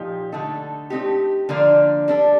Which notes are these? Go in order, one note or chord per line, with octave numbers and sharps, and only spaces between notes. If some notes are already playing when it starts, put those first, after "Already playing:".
Already playing: A#2 F3 D#4 G4
D3 A3 D#4 A4
A3 C4 D#4 G4
D3 F3 A#3 D4
G3 D4 A4